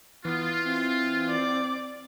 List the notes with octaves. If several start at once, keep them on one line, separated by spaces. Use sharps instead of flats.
E3 B3 F4
C4
D5